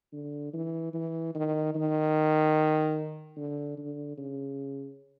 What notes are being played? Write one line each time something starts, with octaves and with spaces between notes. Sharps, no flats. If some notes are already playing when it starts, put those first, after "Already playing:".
D3
E3
E3
D#3
D#3
D3
D3
C#3